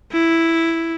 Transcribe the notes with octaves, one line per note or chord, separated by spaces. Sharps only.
E4